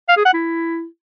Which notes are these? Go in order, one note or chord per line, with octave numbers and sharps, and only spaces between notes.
F5
G#4
F#5
E4